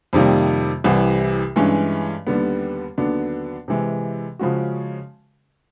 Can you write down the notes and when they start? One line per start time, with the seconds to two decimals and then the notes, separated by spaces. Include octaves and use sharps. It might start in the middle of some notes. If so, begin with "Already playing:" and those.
0.13 F2 C3 D#3 G3 A#3
0.84 C2 C3 E3 G3
1.56 G2 E3 G#3 C#4
2.27 D#2 D3 G3 B3
2.98 D#2 D3 F#3 B3 D4
3.68 C3 E3 G#3
4.39 C#3 F3 G#3 C#4 F#4